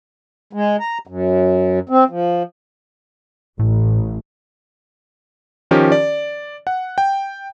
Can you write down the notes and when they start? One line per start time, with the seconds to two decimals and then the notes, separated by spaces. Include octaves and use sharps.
0.53 G#3
0.80 A#5
1.07 F#2
1.89 C4
2.10 F3
3.59 A1 A2
5.71 D#3 F3 C#4 G4 A#4
5.92 D5
6.67 F#5
6.98 G5